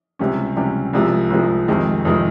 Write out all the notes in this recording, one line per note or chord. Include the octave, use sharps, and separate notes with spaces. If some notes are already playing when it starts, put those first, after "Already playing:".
C#2 C3 G3 C#4
C#2 C3 G3 C#4
C2 C3 F3 G#3
C2 C3 F3 G#3
F2 C3 D#3 G#3
F2 C3 D#3 G#3